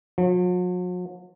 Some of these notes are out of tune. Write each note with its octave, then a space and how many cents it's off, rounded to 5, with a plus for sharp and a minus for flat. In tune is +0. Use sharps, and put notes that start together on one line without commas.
F#3 -45